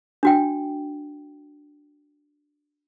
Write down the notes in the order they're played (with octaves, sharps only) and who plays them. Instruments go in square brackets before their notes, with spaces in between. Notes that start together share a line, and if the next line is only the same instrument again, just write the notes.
[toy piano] D4 F#4 G5